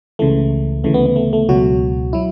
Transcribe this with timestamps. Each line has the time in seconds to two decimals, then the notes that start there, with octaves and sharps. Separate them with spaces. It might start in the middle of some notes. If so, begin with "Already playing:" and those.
0.19 C#2 C#3 E3 A3
0.84 D2 C#3 E3 A3
0.94 B3
1.06 B3
1.16 A3
1.33 A3
1.49 C#2 B2 F#3 F#4
2.13 F#3 E4